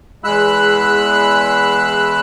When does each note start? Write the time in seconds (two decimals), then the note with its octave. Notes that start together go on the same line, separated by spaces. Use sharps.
0.24 E2 G#3 B5 E6 F#6